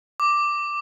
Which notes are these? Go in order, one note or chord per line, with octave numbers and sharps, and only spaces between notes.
D6